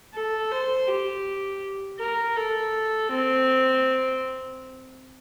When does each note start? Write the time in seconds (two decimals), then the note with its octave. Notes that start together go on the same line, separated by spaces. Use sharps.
0.13 A4
0.51 C5
0.87 G4
1.99 A#4
2.36 A4
3.10 C4